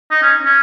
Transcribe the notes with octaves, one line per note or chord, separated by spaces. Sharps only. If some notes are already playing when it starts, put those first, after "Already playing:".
D#4
C#4
C#4